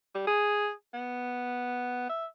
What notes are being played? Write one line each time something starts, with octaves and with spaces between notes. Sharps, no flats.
G3
G#4
B3
E5